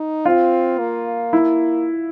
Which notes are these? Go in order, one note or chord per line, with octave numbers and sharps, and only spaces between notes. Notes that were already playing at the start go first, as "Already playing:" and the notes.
Already playing: D#4
C4 F4
A#3
E4